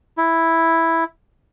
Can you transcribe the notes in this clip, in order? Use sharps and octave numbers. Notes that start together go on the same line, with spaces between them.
E4